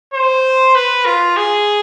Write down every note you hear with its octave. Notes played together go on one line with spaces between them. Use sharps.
C5
B4
F4
G#4